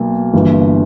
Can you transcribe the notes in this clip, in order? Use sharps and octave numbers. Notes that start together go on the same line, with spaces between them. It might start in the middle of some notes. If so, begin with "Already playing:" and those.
Already playing: B1 B2 A#3
G1 G2 E3 A#3